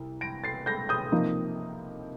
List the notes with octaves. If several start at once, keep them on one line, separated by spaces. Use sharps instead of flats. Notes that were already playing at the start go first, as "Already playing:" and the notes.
Already playing: C2 C3
A#6 D7
A6 C7
G6 A#6
D#6 G6
C3 F3 A#3 D#4